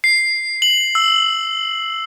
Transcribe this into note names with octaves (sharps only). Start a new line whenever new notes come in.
C7
F#7
E6